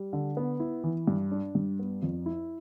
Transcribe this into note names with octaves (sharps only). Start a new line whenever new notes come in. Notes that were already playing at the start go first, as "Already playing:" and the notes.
Already playing: G3
D3
B3
E4
E3
G2
D4
G2
B3
F2
E4